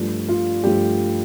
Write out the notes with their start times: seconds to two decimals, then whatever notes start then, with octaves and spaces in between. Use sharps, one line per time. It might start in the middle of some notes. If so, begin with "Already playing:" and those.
Already playing: G2 F3 A3
0.29 F4
0.63 G2 F3 A3 G4